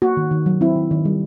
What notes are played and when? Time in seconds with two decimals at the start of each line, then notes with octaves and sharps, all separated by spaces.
0.02 A#3 F#4
0.17 D#3
0.31 D#3
0.46 F#3
0.61 C4 E4
0.76 D#3
0.91 D#3
1.05 G3